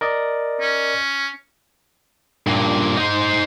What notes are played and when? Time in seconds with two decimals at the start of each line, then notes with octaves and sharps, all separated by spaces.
0.01 A#4 D5 D#5
0.60 C#4
2.47 G2 A#2
2.97 D#4 C5